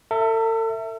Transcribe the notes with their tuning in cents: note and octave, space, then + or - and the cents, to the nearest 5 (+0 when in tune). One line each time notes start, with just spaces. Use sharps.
A4 +40 E5 +0